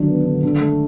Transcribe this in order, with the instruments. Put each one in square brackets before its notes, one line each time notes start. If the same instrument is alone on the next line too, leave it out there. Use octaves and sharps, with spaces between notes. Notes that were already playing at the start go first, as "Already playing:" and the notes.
Already playing: [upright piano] D3 F#3 D4 [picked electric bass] D#3
[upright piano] B3
D3
D3
A3